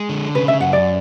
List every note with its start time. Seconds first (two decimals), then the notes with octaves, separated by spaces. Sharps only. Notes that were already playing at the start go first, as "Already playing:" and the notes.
Already playing: G#3
0.09 D3
0.35 C#3 B4
0.48 E5
0.60 F#2 F#5
0.73 D5